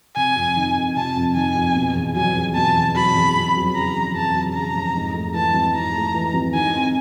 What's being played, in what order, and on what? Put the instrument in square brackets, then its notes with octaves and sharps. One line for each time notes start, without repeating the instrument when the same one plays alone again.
[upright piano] C3 [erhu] G#5
[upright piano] F2
D#3
F2
[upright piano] C3 [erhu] A5
[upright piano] F2
[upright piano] D#3 [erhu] G#5
[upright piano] F2
B2
E2
[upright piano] F#3 [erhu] G#5
[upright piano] E2
[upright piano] B2 [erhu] A5
[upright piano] E2
[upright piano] F#3 [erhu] B5
[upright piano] E2
F2
F#3
[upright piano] C#3 [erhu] A#5
[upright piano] F1
[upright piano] F2 [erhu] A5
[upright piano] F#3
[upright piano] C#3 [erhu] A#5
[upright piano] F1
G#2
A3
[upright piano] E3 [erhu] A5
[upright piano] G#1
[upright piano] G#2 [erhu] A#5
[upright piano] A3
E3
G#1
[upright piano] D#3 [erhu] G#5
[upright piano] C4